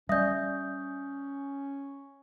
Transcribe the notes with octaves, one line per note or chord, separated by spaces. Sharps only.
G3 C#4 D5 E5 D#6 G6